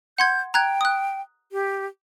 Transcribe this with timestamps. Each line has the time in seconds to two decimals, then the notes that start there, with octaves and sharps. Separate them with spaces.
0.18 F#5 C6 G6 G#6
0.54 G5 A#5 F#6 G#6
0.81 D#6 F#6
1.52 G4